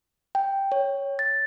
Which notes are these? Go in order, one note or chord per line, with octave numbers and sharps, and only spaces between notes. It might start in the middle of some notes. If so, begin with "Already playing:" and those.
G5
C#5
A6